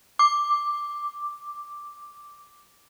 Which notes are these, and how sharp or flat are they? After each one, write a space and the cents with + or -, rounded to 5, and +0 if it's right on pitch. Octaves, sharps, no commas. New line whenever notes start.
D6 +0